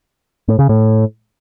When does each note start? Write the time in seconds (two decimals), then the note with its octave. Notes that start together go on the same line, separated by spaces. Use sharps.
0.48 A2
0.59 C#3
0.69 A2